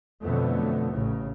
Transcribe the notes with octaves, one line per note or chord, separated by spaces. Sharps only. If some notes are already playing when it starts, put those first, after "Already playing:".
F2 B2 D3 F#3 A3 B3
A1 A2 C#3